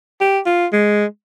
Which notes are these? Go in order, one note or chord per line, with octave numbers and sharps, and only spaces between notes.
G4
F4
G#3